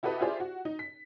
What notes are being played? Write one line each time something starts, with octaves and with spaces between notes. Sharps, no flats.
E4 F#4 G4 A4 B4 D#5
E4 F4 G4 G#4 C5 D5
F#4
D#4
B6